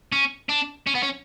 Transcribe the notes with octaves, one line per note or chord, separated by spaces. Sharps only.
C#4
D4
C#4
B3
C#4